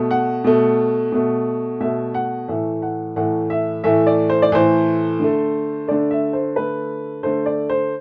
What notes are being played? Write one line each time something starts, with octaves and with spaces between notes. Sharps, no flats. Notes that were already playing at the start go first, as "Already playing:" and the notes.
Already playing: B2 A3
F#5
B2 A3
B2 A3
B2 A3 E5
F#5
A2 E3 A3 E5
F#5
A2 E3 A3 F#5
E5
A2 E3 A3 E5
D5
C5
D5
A2 E3 A3 C5
D3 A3
D3 A3 D5
E5
C5
D3 A3 B4
D3 A3 C5
D5
C5